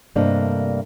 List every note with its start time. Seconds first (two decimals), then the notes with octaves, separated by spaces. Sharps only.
0.15 G2 C3 A3 A#3 D4 D#5